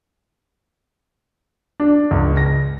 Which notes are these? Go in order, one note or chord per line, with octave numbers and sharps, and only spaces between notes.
D4
C#2
A#6